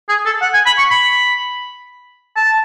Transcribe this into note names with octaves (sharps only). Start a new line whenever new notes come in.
G#4
A4
F#5
G#5
B5
C#6
B5
A5